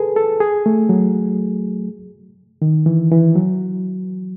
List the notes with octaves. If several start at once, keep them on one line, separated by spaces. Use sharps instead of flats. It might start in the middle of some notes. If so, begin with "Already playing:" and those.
Already playing: G#4 A4 B4
A4
G#4
A3
F#3
D#3
E3
E3
F#3